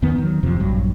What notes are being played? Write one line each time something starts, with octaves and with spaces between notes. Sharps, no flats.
E2 D#3 B3
D#3 F#3
D#1 F2 C3 F3
A#1 G2 F#3